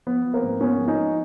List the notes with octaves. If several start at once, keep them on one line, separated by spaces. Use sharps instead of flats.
F3 B3
F3
A#3 C4
G#2
G#2 B3 C#4
F3
C#4 D#4
F3